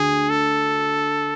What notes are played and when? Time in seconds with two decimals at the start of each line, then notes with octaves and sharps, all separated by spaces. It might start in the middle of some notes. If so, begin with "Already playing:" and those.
Already playing: D2 D3 G#4
0.30 A4